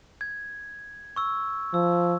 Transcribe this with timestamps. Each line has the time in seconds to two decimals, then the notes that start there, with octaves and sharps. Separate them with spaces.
0.21 G#6
1.16 C#6 E6
1.74 F3 E6